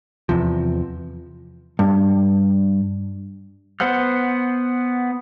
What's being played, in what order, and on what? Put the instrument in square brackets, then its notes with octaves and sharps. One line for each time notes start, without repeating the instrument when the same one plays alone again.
[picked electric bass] E2 C3 F3
[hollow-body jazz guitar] G2
[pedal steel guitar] B3 C5 F#5 F6